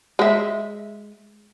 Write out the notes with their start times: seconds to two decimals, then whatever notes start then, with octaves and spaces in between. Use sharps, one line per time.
0.19 G#3 E5